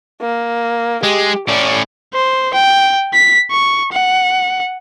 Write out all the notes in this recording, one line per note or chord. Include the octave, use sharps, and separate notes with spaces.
A#3
G#3 G4
A2 C#4 D5
C5
G5
B6
C#6
F#5